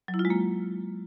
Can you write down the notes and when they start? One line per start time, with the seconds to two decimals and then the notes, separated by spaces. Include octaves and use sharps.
0.08 F#3
0.14 E4
0.19 F4
0.25 G#3
0.30 A#3